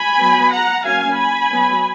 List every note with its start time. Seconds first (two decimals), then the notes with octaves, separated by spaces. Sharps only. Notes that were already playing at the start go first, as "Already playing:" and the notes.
Already playing: G#5 B5
0.20 F#3 B3
0.53 F#5 A#5
0.85 F#3 A#3 C#4 F5 G#5
1.18 G#5 B5
1.51 F#3 B3